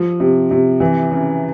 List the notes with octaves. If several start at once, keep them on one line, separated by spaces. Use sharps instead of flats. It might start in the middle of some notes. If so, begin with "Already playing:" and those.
Already playing: F3
C3
C3
E3
C#3